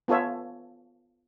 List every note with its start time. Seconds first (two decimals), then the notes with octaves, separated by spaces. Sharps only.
0.08 B3 F4 A4 C#5 E5